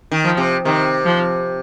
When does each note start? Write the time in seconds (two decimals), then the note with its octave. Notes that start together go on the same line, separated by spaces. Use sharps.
0.12 D#3
0.25 F3
0.37 C3
0.65 C3 D#3
1.05 F3